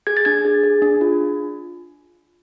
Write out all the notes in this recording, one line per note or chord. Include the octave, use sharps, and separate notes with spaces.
G#4 G#6
A6
D4 G#6
G#4
G#4
D4
F4